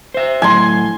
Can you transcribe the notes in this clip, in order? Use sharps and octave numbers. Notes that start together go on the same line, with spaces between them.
C5 E5
A2 F#3 G#5 C6